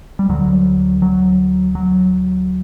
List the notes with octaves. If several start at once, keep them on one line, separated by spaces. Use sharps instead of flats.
G3
D2 D3 F#3
F#3
F#3